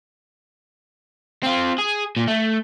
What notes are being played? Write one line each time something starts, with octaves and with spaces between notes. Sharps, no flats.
C4 F4
G#4
A#2
A3